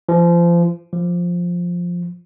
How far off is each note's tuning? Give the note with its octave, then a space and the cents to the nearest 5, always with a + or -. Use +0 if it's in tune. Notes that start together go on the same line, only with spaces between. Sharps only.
F3 -30
F3 +5